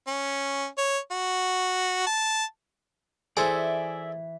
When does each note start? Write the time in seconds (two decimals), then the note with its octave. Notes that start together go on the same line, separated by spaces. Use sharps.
0.07 C#4
0.78 C#5
1.11 F#4
2.06 A5
3.37 E3 G#4 A4 C5 D5 E5 G#5